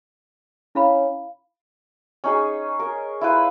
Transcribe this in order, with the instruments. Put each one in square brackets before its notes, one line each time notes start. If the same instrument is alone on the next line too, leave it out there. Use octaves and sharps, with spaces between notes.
[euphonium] C#4 [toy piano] E4 F5 B5
[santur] C#4 D#4 G#4
A#4
E4 F4 B4